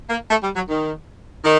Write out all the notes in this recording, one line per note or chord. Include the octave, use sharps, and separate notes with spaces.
A#3
A3
G3
F#3
D#3
D#3